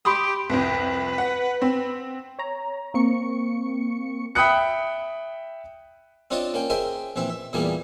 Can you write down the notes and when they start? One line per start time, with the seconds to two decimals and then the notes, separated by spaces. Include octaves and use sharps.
0.05 G4 B5 C6 D#6
0.50 C2 F2 B4
1.18 F#5
1.62 C4
2.39 C#5 A#5
2.94 A#3 C4 C#6 C#7
4.35 E5 G5 B5 D#6 F#6 C#7
6.31 C4 D4 F4 C#5 D#5 A5
6.54 A#3 C#4 G5
6.70 G#4 A#4 C5 D#5 E5 G5
7.16 A#1 E3 C4 E5
7.30 E5
7.53 E2 A#2 E3 G3 A#3 G#4